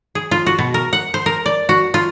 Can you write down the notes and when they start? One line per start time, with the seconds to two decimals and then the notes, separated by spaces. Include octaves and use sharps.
0.15 G#4
0.31 F4
0.46 F#4
0.59 B2
0.74 A#4
0.93 F#5
1.14 C5
1.26 A#4
1.46 D5
1.69 F#4
1.94 F4